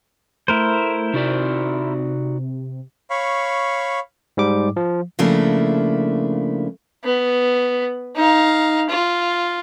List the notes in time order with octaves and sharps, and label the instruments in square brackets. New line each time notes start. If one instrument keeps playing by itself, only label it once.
[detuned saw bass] A3 [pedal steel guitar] E4 A#4 C5
[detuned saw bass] C3 [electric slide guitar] D#4 F#4 D5
[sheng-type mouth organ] C#5 F5 B5 C#6
[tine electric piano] G#2 G3 D6
F3
[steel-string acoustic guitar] C#3 F3 A3 A#3 D4 E4
[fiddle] B3
D#4 F5
F4